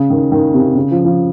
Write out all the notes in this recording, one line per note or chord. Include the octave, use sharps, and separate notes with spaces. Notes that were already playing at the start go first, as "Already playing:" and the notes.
Already playing: C#3
D#3
D#3
C3
C#3
F3
F3